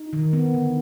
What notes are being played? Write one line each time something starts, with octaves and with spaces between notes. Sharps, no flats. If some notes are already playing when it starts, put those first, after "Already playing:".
Already playing: D#4
D#3
B3
D3